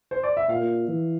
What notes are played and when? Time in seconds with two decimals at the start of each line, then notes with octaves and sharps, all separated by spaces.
0.11 C5
0.23 D5
0.37 E5
0.49 A#2 F5
0.88 E3